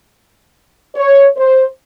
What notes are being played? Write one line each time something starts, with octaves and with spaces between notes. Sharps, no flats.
C#5
C5